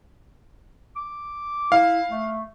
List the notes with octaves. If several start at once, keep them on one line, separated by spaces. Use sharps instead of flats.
D6
E4 F5
A3